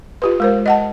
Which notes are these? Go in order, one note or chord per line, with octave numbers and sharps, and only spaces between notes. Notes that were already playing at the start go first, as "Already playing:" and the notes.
F4 G4 B4
G#3 A#4 C5
D#5 F#5 A5